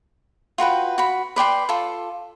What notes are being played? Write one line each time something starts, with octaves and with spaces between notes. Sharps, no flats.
F4 F#4 B4 G5
F#4 B5
B4 D5 G5 C6
F4 A4